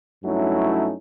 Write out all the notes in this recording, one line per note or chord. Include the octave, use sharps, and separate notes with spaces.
G2 F#3 A3 C#4 D#4 E4